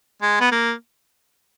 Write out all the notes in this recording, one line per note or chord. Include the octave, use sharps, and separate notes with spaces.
G#3
B3
A#3